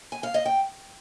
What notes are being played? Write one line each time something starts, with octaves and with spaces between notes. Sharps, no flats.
G#5
F5
D#5
G5